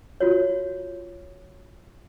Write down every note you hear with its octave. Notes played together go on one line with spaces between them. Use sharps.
F4 F#4 C#5